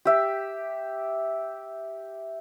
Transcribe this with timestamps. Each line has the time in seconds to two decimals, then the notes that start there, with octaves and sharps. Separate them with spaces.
0.05 G4 E5